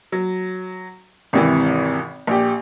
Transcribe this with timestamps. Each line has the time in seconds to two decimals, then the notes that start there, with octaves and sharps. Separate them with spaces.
0.12 F#3
1.33 G#1 C3 E3
2.27 A#1 G4